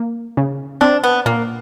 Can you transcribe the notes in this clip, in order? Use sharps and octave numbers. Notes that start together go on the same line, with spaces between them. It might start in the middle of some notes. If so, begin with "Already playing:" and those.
Already playing: A#3
C#3
C4 D4
B3
A#2 A#3